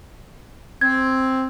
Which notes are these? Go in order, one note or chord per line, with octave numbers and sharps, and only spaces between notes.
C4 G#6